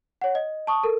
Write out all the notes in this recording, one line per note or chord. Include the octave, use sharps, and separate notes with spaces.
C#5 F#5
D#5
A5 C#6 D#6
A4 A#4